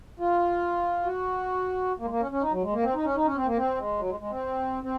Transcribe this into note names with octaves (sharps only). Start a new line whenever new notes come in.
F4
F#4
A#3
G#3
A#3
C#4
C#4
D#4
F#3
G#3
A#3
C4
D#4
C#4
D#4
C#4
C4
A#3
C4
G#3
F#3
G#3
G#3
C4
C4